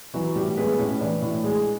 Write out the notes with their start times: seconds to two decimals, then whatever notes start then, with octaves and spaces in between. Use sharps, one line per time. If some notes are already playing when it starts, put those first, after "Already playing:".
0.14 E3 F#3 F#4
0.35 A2 G3 G4
0.57 G#3 B3 B4
0.79 A2 C#4 C#5
1.00 E3 D4 D5
1.22 A2
1.44 G#3